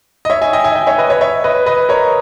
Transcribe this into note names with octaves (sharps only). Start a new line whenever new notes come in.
D#5
C#5 E5
E5 G#5
D#5 G5
E5 G#5
D#5 G5
C#5 E5
B4 D#5
C#5 E5
C#5 E5
B4 D#5
B4 D#5
A#4 C#5